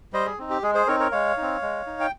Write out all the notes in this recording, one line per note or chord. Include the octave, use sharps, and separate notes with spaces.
G3 C5 D#5
G#4
C4 D#4
G4
G#3 G#4
G#4 C5
C4 D#4 A#4 C#5
A#4 C#5
G#3 C#5 F5
C4 D#4
G#3
D#4
G5